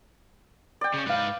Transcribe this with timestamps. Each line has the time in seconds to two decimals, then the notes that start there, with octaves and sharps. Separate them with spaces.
0.81 D5 G5
0.94 C#3 C#4
1.07 G#2 B4 F5 G6